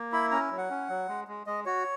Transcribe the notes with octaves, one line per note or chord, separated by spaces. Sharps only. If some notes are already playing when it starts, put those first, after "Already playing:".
Already playing: A#3
E4 B5
C#4 A#5
F#3
F#5
C#4
F#3
G#3
G#3
G#3 D#5
F#4 C#5